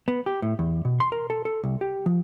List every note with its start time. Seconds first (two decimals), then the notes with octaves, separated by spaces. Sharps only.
0.08 B3
0.26 G4
0.42 A2
0.59 E2
0.85 B2
1.00 C6
1.12 A#4
1.30 A4
1.45 A4
1.64 C2
1.81 G4
2.06 F3